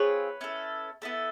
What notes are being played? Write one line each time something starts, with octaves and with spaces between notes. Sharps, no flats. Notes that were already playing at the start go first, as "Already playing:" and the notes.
Already playing: C4 F4 G#4 B4 C#5
C#4 E4 A4
B3 E4 A4